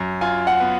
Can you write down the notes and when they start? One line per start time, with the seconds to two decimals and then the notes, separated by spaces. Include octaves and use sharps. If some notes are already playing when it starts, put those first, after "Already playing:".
Already playing: F#2
0.21 F4 G#5
0.47 F#5
0.60 B3